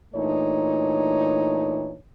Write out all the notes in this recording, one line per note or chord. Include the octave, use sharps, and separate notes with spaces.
A#2 E3 A3 D4 D#4 C#5